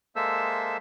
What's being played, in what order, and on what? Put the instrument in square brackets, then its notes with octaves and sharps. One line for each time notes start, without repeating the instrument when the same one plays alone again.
[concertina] G#3 A#3 A4 C5 E5 E6